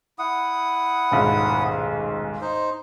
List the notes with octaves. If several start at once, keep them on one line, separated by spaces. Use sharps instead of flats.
E4 F#5 D#6
D#1 B1 G#2
D#4 C5